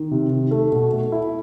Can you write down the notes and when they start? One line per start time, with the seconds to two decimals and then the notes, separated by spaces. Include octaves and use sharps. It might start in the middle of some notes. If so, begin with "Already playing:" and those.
Already playing: D#3
0.11 C3
0.31 D#3
0.51 A3
0.72 B2
0.92 A3
1.12 E4